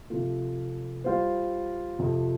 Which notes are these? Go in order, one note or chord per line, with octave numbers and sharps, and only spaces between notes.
C3 F3 A3 F4
G3 F4 C5
F2 C3 F3